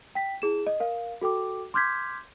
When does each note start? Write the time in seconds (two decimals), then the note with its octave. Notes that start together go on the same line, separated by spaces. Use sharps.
0.15 G5 B6
0.42 E4 G#4 E7
0.67 D#5
0.80 A#4 F5
1.21 F#4 A4 G5 D6
1.74 C6 D6 F6 G6 G#6 B6